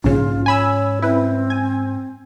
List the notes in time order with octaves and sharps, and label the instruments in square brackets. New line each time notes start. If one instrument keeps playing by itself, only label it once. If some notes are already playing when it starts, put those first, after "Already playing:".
[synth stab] A#1 C#3 [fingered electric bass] G#2 C#4 [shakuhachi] F4
[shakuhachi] C#5 [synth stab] G#5 B5 E6
[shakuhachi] C4 [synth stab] E4 B4
[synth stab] G#5